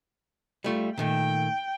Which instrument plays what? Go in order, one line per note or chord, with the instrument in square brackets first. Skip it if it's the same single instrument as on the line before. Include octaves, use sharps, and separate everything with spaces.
[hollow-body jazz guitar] G3 A3 F4
[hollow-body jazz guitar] A#2 D#3 A3 [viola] G5